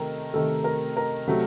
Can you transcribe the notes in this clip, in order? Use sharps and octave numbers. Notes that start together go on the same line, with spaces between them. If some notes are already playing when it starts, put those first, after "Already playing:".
Already playing: C3 D#3 A3 A4 A#4
C3 D#3 A3 A4
A#4
A#4
C3 F#3 A3